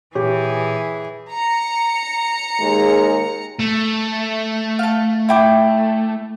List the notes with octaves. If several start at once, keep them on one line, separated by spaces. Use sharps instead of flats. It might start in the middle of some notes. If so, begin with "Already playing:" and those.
A#2 E3 G4 G#4 C#5
A#5 C#7
D#2 G#3 G#4
A3
F5 A5
E4 G5 D6